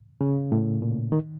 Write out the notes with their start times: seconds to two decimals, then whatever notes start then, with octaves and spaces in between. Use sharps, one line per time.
0.21 C#3
0.52 A2
0.82 A#2
1.12 D#3